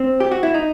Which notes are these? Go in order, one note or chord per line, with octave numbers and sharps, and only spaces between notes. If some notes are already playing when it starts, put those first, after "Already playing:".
Already playing: C4
G4
F#4
E4
D#4